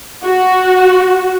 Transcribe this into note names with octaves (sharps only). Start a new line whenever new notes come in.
F#4